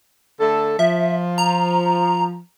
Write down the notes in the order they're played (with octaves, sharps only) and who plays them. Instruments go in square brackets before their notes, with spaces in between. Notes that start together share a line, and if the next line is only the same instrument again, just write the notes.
[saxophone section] D3 A3 A4
[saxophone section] F3 [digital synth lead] E5
[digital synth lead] A#5